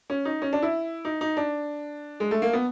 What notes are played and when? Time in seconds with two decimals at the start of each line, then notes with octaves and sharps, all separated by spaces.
0.10 C#4
0.25 D#4
0.42 C#4
0.53 D4
0.62 E4
1.05 D#4
1.21 D#4
1.37 D4
2.20 G#3
2.31 A3
2.42 A#3
2.53 B3